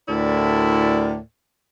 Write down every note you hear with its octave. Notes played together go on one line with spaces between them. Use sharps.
D2 A2 E4 A#4 D5